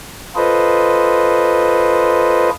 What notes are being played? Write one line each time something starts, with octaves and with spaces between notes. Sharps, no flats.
F4 A4 B4 C5 D#5